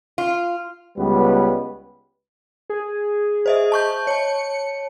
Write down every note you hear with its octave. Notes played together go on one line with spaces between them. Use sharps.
F4
C#2 G3 B3 B4
G#4
C5 D#5 E5
A5 C#6 G6
C#5 A5 C#7